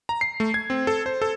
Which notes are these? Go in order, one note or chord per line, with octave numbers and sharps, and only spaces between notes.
A#5
C7
A3
G#6
C4
A4
C5
A4